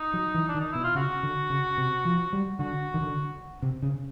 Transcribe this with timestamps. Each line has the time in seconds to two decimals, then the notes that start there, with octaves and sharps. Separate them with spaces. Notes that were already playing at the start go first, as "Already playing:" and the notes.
Already playing: D#4
0.14 F#3
0.34 E3
0.48 D4
0.55 D#3
0.60 D#4
0.72 B2 E4
0.84 F4
0.95 C#3 F#4
1.23 D3
1.50 C#3
1.78 C3
2.05 F3
2.33 G3
2.59 D3 F#4
2.94 D#3
3.01 D3
3.62 C3
3.83 C#3